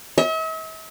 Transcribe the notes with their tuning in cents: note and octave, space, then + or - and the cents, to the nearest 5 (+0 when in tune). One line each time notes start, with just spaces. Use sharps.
E5 -45